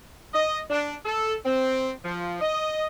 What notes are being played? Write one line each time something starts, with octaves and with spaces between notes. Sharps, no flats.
D#5
D4
A4
C4
F3
D#5